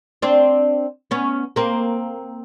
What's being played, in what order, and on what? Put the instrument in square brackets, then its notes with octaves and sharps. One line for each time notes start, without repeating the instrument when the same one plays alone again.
[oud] C4 D4
B3 C#4
A#3 C4